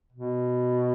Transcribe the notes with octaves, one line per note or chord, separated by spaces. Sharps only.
B2